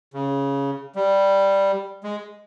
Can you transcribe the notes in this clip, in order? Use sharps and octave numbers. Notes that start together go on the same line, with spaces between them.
C#3
G3
G#3